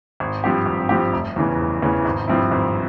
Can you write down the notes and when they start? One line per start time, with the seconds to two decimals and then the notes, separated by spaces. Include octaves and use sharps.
0.20 G#1
0.44 G2 F3 C4 G4
0.66 G#1
0.89 G2 F3 C4 G4
1.13 F1
1.36 E2 C#3 E3
1.59 F1
1.82 E2 C#3 E3
2.05 G#1
2.28 G2 F3 C4 E4
2.51 G#1